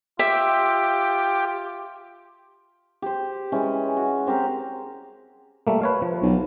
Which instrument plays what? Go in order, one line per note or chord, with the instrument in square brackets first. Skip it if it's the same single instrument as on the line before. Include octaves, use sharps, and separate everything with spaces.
[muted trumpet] F4 [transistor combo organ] G4 [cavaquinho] E5
[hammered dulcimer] G4 C5
E3 G#3 C#4
F#4
C4 G4 A#4 C5
[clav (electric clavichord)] G3 A3 A#3
B4 C#5 F5
F3
[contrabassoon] B1